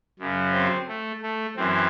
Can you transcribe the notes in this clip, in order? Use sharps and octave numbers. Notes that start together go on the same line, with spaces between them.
F#2 C#3 F#3
C4
A3
A3
F#2 E3 C4